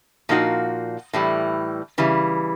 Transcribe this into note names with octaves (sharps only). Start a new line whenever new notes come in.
A#2 F3 A#3 D#4 F#4
A2 E3 G3
C#3 E3 G3